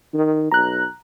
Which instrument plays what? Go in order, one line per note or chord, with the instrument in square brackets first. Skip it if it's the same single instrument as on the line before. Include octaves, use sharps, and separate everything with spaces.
[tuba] D#3
[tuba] B1 [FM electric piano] A#5 F#6